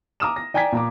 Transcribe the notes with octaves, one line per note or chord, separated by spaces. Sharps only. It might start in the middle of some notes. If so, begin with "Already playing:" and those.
A#5 D6 D#6 F6 E7
A#6
D5 G5 G#5 A#5 G#6 B6
A#2 A#5 D6